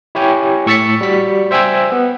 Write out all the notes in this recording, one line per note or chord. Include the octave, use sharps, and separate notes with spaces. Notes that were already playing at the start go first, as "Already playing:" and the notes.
E4 G4 C#5 G5 G#5
A2 C#6 E6 A6 B6 C#7
G3 F#4 B6
C5 E5 G5 G#5 E6 G#6
B3